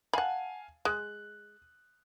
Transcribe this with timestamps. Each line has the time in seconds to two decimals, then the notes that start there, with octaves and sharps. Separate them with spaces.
0.13 F5 F#5 G#5 A5 B5
0.85 G#3 F#6